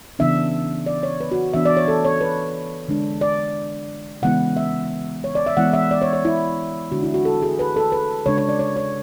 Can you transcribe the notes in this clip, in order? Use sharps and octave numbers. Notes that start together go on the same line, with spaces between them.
C#3 E3 B3 D4 E5
D5
C#5
B4
F#4
E3 B3 D4 E5
D5
C#5
A4
C#5
B4
D3 G#3 D4
D5
C#3 E3 G#3 B3 E4 F#5
E5
C#5
D5
E5
E3 G#3 B3 E4 F#5
E5
D5
C#5
C#5
E4
D3 G#3 D4 F#4
E4
F#4
A4
G#4
B4
A4
B4
C#3 G#3 D4 C#5
C#5
D5
C#5
C#5